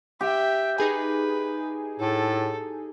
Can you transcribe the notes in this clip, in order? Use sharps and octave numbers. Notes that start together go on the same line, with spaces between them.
G4 E5 G5
D#4 G#4 B4 G#5
A2 A4